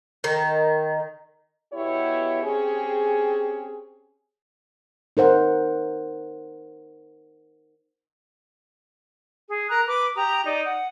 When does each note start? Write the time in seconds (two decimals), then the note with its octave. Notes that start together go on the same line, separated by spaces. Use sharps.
0.24 D#3
1.73 B2 B3 E4 G4 C#5
2.43 C4 C#4 G4 G#4
5.17 D#4 A#4 C5 F#5
9.48 G#4
9.70 A#4 A#5 F#6
9.87 B4 D6
10.16 G4 A#5 D#6
10.45 D#4 D5
10.66 F#5